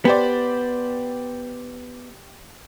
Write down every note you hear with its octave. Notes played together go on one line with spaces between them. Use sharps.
B3 G4 C5 D5